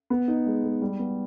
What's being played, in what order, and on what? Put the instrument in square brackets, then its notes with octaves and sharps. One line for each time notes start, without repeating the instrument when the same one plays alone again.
[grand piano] B3
D#4
G#3
G#3
G3
B3